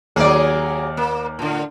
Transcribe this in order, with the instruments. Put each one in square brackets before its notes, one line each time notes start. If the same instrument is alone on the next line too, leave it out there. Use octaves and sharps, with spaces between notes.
[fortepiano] D#2 D5 [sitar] F#3 A#3 G#4
[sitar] A#3
A2 D3